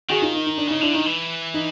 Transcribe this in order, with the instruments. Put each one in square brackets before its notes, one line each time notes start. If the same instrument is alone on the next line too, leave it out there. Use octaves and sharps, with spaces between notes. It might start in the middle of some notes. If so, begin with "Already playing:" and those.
[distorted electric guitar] D#3 [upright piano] F#4 G#4
[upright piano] D#4 F4
D#4
D#4
D4
[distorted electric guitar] C#3 [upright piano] D#4
[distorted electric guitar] D3 [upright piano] D4 E4
[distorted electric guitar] D#3 [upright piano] D#4
[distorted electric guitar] E3
[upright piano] D#4